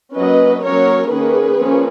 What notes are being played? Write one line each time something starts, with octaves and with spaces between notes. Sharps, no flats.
F#3 A#3 C#4 B4 D#5
F#3 A#3 C#4 A#4 C#5
D#3 A#3 C#4 G#4 B4
F3 A#3 C#4